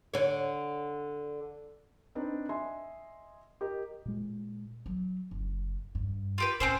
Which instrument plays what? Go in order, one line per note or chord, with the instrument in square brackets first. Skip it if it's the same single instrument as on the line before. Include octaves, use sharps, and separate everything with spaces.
[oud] D3 C#5
[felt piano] C4 D4 D#4 B4
D#5 E5 G#5 C6
G4 A#4 D#5
[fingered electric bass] A#2 G#3
[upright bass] F#3
F#1
G2
[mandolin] F4 G4 B4
[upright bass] A2 [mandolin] C4 C#4 C5